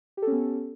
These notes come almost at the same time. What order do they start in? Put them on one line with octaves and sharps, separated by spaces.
G4 A4 C#4 B3